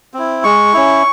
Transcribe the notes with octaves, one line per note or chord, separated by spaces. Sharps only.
C4 E4
G#3 C#6
C#4 E4